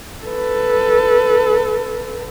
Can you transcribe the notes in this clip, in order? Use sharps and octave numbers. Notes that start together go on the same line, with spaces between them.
A4 B4